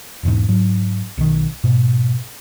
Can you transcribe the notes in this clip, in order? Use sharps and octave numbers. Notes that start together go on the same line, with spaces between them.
E1 E2 G#2
G#2 F#3
B1 D#3
G#2 B2